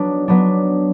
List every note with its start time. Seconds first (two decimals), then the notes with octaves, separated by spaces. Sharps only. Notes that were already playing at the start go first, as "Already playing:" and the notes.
Already playing: F#3 B3 D4
0.28 F#3 B3 D4